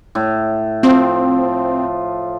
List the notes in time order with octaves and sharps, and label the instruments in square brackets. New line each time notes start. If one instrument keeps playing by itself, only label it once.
[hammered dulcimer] A2
[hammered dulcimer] F3 [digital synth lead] C4